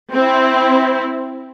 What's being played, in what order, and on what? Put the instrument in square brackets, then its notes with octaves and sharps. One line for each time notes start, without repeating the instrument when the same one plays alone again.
[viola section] C4 E4